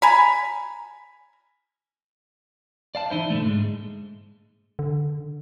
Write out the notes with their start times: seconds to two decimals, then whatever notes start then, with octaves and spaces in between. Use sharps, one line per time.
0.02 G#5 A#5 B5
2.95 D5 F5 A5
3.10 E3 D#4 E4 C5
3.30 A#2 D3 A3
3.44 G#2 G#3
4.79 D3